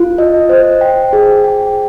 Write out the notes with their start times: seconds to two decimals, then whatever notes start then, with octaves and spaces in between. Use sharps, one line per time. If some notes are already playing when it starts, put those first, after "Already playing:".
Already playing: F4
0.18 D#5
0.49 C5
0.81 G5
1.13 G#4
1.44 G5